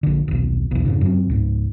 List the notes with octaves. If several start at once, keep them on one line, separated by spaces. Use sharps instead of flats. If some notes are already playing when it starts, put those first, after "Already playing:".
A#1 D3
D#1 B1
B1 E2
F2 G#2 C#3
F#2 F#3 C4
C#2 G#2